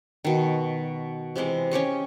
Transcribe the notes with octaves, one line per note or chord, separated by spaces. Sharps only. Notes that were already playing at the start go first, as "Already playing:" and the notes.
B2 D#3
C3 E3 G#3 D#5
C#4 G4 C#5 D#5